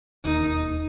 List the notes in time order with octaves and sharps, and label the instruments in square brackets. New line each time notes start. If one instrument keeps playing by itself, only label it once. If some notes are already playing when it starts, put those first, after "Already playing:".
[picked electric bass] E1 D#2 D#3 [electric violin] D#4